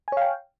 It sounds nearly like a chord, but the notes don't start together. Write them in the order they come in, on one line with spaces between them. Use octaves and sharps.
G#5 C#5 F5 G5